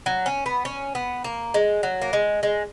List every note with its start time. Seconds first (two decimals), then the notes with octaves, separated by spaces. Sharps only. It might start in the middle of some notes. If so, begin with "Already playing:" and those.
0.06 F#3
0.26 C#4
0.46 B3
0.65 C#4
0.95 B3
1.24 A#3
1.54 G#3
1.83 F#3
2.02 A#3
2.13 G#3
2.43 G#3